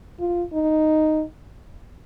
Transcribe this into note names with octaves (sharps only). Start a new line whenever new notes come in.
F4
D#4